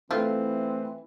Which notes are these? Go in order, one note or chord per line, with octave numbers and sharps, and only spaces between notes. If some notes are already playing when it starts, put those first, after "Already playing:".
E3 A3 C4 E4 F4 A4 B4